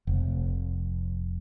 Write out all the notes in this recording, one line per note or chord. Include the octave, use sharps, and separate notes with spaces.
F1